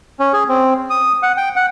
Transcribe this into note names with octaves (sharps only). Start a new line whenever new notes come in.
C#4
G#4
C4
D#6
F#5
G5
F#5